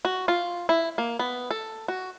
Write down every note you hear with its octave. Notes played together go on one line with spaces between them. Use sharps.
F#4
F4
E4
A#3
B3
A4
F#4